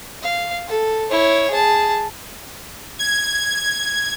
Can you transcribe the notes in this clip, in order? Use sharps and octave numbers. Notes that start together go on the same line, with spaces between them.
F5
A4
E4 C#5
G#4 A5
G#6